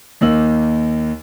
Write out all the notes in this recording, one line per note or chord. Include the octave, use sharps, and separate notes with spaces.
D#2 A#3 D#4 E6 F#7